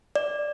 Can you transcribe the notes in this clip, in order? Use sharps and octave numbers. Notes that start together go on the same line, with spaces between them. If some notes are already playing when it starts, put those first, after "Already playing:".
D5